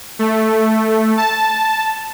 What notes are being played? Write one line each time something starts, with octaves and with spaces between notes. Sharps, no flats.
A3
A5